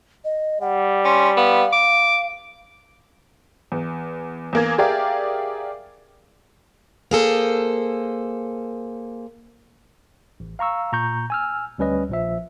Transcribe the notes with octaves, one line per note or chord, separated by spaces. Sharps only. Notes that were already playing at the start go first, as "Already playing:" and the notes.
D#5
G3 F#5
C#4 C6
B3 F5
D6
E2
E2 A#3 G#6
G4 G#4 A#4 D5 E5 F5
A#3 G#4 A4 C5
A1
F5 A#5 C#6 E6
A#2 A#5 C#6 G6
G#5 E6 F6
D2 G3 C#4 B4 D#5
A#1 F3 E5